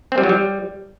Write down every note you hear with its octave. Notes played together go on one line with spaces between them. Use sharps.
C4
G3
F#3
G3